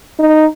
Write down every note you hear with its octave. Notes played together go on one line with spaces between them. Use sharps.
D#4